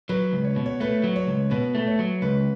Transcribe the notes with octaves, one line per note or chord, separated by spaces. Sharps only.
F#3 B4
C#2
C#5
B2
C#5
A3 B4
F#3
C#5
C#2
B2 B4
A3
C#5
F#3
C#2 B4